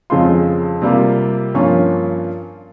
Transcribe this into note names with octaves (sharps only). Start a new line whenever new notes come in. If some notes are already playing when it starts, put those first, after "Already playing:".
F2 C#3 G#3 C4 F4 C6
C3 G3 A#3 F4
G2 F3 A#3 C#4 F4 C#6